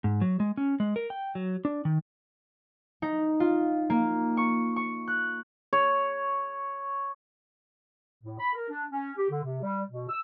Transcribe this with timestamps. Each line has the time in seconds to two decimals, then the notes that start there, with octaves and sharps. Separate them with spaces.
0.04 G#2
0.21 F#3
0.40 G#3
0.57 C#4
0.80 G#3
0.96 A#4
1.10 G5
1.35 F#3
1.65 D4
1.85 D#3
3.02 D#4
3.40 F4
3.90 A#3
4.37 C#6
4.76 C#6
5.08 F#6
5.73 C#5
8.23 A2
8.39 B5
8.54 A#4
8.69 D4
8.89 C#4
9.17 G4
9.30 D3
9.43 C3
9.62 G3
9.91 B2
10.09 E6